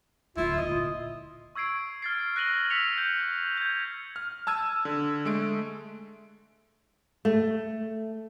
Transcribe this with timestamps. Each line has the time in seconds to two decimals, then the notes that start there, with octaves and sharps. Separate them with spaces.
0.37 D1 D3 E4 F4
0.58 D#2 A2 D#5
0.70 A#2 F4
1.55 C#6 E6 G#6 C7 D7
2.02 F6 A6 C7
2.36 F#6 A#6 D#7 F#7 G7
2.70 E6 B6 C#7 F7
2.98 G6
3.57 G6 G#6
4.16 F6
4.47 A5 E6 G#6 D#7
4.85 D3
5.25 G#3 A3 D7
7.25 A3